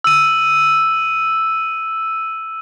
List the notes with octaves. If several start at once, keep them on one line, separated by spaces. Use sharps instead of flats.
E6 D#7